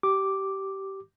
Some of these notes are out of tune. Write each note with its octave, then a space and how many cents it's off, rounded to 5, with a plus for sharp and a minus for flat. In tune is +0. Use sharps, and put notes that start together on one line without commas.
G4 -20 D6 +0